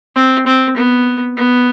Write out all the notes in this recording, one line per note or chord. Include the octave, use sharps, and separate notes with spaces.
C4
C4
B3
B3